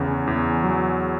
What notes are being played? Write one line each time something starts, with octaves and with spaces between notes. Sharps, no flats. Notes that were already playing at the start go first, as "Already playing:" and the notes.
Already playing: E2 C#3
E2
F#3